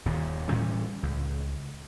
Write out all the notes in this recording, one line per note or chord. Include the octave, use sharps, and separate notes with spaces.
D#1 D#2 A#2
A2 E3 G3 C#4
C#2